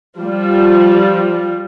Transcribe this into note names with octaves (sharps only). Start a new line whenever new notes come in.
F3 G3